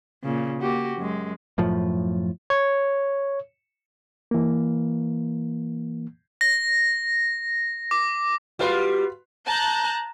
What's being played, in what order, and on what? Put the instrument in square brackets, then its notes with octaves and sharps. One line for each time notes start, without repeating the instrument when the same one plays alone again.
[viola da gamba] A#2 C#3
A#3 F#4 G4
F#2 G#3
[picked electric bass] F#2 A2 F3
[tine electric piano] C#5
[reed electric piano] E3 A#3
[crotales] A#6
D6
[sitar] G3 F4 [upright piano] F#4 B4 C6
[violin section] A5 A#5 F#6 G6